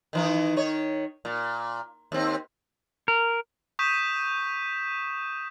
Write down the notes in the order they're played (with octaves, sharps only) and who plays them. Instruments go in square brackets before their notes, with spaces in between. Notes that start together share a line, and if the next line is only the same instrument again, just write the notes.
[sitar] D#3 E3 D#4
D#3 C#5
A#2
D#2 C4
[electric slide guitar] A#4
[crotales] C#6 D#6 G6 B6 D#7 E7